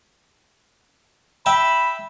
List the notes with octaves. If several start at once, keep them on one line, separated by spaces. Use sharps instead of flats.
E5 G5 A5 B5